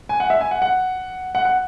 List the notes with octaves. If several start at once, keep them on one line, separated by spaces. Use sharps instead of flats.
G#5
F#5
E5
G#5
F#5
F#5
F#5
F#5